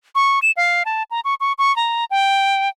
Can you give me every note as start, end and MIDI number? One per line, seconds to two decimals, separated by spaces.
0.15 0.39 85
0.42 0.51 100
0.57 0.83 77
0.85 1.03 81
1.11 1.20 82
1.25 1.35 85
1.40 1.53 85
1.58 1.75 85
1.76 2.05 82
2.11 2.69 79